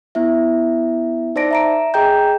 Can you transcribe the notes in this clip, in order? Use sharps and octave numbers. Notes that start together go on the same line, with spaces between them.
B3 E4 E5
D#4 C5 D5 A5 A#6 D7
E5 A#5 D7
G#4 D#5 G5 A#5 G6